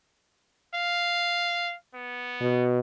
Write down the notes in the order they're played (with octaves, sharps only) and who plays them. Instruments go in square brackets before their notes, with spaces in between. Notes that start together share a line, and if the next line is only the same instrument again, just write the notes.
[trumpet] F5
B3
[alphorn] B2